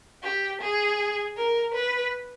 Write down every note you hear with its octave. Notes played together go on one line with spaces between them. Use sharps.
G4
G#4
A#4
B4